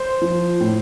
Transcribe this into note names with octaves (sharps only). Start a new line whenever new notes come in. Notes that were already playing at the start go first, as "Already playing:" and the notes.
Already playing: C5
F3
A2